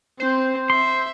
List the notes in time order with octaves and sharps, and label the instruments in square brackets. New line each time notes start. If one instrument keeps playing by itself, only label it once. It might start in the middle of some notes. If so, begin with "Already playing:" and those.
[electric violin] C4 [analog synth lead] C5
[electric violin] E5 [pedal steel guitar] C6